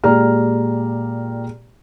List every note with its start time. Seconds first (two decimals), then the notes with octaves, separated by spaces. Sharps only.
0.04 A#2 G#3 G4 D5 A#5 F6